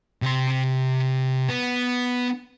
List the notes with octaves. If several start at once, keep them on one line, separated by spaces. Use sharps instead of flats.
C3 C6
B3